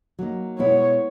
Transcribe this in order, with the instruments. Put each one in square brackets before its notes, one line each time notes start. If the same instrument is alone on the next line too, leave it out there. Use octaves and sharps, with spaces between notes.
[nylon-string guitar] F#3 A#3 D#4
[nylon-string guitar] B2 G#3 B3 E4 [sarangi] C#5